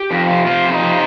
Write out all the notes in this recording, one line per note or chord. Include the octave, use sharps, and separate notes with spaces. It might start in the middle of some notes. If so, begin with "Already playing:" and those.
Already playing: G4
F2
C3
C3 F4
F2
D#4
C3